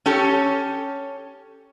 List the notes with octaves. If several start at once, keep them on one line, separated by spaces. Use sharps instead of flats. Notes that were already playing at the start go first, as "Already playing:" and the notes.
C#4 G4 A4 C#5